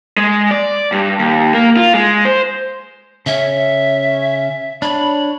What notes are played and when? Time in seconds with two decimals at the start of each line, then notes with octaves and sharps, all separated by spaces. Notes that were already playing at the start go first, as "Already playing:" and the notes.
0.17 G#3
0.51 D5
0.92 G2
1.19 D#2
1.54 A#3
1.77 F4
1.94 G#3
2.25 C5
3.26 C#3 C#4 E5
4.82 D4 C#5 B5